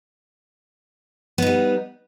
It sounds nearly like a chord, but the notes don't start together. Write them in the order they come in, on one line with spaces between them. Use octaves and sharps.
B3 D#4 G3